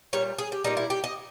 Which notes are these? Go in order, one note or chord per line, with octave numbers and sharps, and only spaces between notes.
A#2 G3 C#5
G#4
G4
A#2 G3 D#4
E4
G4
D#5